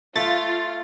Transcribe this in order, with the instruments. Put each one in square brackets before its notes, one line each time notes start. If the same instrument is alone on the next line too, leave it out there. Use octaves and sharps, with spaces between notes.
[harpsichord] A3 [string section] F4 [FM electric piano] A6